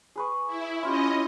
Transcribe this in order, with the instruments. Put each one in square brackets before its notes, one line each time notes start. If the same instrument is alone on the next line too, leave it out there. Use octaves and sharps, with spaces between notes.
[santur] G#4 B4 C#6
[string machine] E4
[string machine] C#4 D#5 [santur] E4 F4 G4